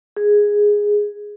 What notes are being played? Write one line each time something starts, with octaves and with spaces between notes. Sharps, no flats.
G#4